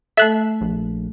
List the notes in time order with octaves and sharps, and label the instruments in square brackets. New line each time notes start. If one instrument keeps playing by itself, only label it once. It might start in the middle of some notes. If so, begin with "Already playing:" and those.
[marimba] A3 A4 [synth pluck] E5 F#6
[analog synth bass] A#1